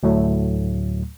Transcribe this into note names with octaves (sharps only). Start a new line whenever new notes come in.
D2 A2 F#3 A3